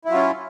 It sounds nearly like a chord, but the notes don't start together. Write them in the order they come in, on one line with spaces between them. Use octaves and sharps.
E4 F#3 F4 C#4